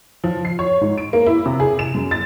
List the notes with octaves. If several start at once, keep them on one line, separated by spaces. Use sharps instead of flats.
F3
C7
C#5
G#2
D7
A#3
E4
C3
G#4
E7
F#2
A6